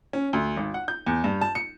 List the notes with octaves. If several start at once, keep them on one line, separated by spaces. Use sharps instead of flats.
C#4
D2
G#1
F#5
G6
E2
G2
A5
C#7